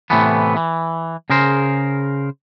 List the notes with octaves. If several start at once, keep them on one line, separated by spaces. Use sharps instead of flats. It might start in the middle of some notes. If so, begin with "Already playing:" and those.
A2 C3 E3 A3 B3
E3
C#3 G#4 A#4 C5